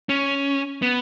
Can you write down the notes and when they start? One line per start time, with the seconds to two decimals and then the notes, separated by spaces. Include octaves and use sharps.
0.09 C#4
0.82 B3